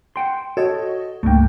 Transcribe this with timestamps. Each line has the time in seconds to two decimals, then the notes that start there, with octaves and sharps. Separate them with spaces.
0.16 F#5 G5 C6
0.57 F#4 A4 C#5 D#5
1.23 C#2 G2 A3 A#3 G5